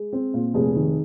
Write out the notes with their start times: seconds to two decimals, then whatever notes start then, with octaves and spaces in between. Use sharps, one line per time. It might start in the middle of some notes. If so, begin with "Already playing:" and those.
Already playing: G#3
0.13 C4
0.34 A#2
0.54 F1 G#4
0.76 D#3